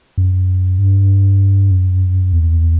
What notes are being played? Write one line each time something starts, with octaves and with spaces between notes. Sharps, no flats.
F#2
G2
F#2
E2